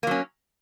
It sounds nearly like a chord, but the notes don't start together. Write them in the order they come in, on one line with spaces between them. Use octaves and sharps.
A#3 F#3 C#4